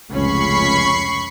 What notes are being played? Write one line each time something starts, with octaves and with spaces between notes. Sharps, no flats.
F1 C#2 C#4 B5 C#6 C7